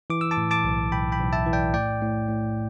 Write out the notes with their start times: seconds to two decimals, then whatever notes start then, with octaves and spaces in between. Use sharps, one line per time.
0.10 E3 D6
0.21 E6
0.31 A5 D6
0.37 A2
0.51 A5 D6
0.64 B1
0.92 B1 G5 B5
1.12 G5 B5
1.19 B1
1.33 E5 A5
1.46 E3
1.53 D5 G5
1.73 A2 D5 G5
2.01 A2
2.28 A2